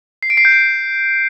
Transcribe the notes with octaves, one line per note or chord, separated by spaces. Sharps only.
C7
D7
C7
G6
D7